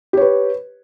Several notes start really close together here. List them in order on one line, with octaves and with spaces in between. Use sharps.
G4 C#5 B4